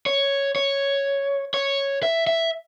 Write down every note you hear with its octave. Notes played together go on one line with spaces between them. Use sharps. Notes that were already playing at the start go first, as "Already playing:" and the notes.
C#5
C#5
C#5
E5
E5